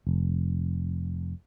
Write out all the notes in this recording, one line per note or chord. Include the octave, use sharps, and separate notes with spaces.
F1